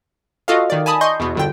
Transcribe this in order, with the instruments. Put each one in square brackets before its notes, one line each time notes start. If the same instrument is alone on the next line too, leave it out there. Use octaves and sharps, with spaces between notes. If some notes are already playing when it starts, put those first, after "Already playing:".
[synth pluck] F4 F#4 A4 D#5 F5
D#3 D5
G#5 A5 B5 D#6
D#5 C6 C#6 G6
E2 B2
G1 D3 G5